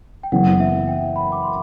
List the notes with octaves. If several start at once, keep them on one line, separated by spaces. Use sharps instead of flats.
G5
F#1 F#2 E3 B3 F#5
E5
G5
B5
D6
C6